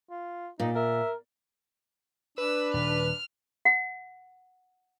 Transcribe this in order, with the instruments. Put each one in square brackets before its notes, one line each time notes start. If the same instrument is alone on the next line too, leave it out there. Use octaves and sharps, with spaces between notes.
[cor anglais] F4
[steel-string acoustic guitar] A#2 [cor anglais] D#4
[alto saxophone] A#4 [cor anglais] E5
[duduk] D4 [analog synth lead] B4 [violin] E6
[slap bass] D#1 [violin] F6
[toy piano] F#5